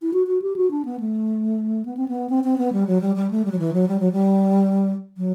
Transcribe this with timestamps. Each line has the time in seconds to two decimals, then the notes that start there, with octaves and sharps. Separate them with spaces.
0.02 E4
0.13 F#4
0.27 F#4
0.42 G4
0.56 F#4
0.71 D4
0.85 B3
1.00 A3
1.86 B3
1.97 C4
2.08 B3
2.30 C4
2.44 C4
2.58 B3
2.73 G3
2.87 F#3
3.01 G3
3.16 G3
3.31 A3
3.45 G3
3.52 F#3
3.59 E3
3.73 F#3
3.88 G3
4.00 F#3
4.12 G3
5.17 F#3